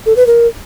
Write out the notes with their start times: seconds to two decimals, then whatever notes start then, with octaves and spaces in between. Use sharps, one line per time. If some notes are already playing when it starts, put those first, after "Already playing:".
0.06 A4
0.16 B4
0.27 A#4